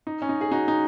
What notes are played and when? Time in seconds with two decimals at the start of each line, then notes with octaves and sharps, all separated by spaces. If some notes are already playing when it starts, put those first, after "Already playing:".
0.07 D#4
0.22 C#4
0.29 D#4
0.41 G#4
0.52 D#4 F#4
0.68 D#4